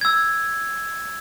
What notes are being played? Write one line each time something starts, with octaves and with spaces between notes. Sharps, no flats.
E6 G#6